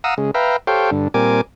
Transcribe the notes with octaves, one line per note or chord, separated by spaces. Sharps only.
F5 F#5 A#5 D#6 E6
C#3 G#3
B4 E5 F5 G5 A#5
G4 A4 C5 C#5 F5 G5
G2 D3
A#2 G3 C4 A#4 G#5 D6